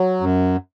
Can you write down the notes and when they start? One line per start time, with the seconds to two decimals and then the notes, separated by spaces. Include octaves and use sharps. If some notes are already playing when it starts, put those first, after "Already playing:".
Already playing: F#3
0.21 F#2